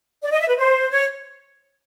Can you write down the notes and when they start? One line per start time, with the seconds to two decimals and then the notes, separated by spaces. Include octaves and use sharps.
0.22 D5
0.31 D#5
0.39 E5
0.48 B4
0.57 C5
0.90 C#5